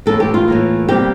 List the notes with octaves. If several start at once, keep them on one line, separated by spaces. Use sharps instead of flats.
A2 E3 A#3 A4
G4
F4
A2 E3 A#3
C3 G3 A#3 G4